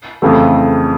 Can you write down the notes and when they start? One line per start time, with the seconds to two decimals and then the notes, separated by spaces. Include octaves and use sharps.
0.22 F2 C#3 E3 A3